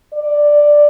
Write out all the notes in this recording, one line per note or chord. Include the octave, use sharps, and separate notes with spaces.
D5